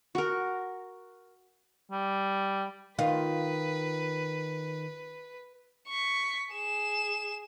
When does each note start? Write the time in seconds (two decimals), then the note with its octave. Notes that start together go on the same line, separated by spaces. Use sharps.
0.15 F#4 A#4
1.91 G3
2.99 D#3 F4 B4
5.88 C#6 B6
6.53 G#4 E7